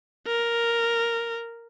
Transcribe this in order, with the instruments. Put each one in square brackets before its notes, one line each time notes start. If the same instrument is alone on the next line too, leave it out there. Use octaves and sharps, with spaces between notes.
[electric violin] A#4